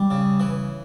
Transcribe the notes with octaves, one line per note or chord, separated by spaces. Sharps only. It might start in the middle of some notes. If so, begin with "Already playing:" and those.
Already playing: G3
C#3
E3